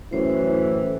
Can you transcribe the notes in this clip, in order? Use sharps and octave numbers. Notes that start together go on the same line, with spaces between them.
F#2 A2 E3 C5